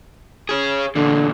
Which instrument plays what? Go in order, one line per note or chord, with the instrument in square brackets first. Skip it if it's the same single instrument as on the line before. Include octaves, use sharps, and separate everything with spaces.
[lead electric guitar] G#4 C#5
[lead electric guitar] E2 A#2 [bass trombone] D3